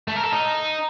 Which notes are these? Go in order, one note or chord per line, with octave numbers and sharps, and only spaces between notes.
A3
A#4
A4
D#4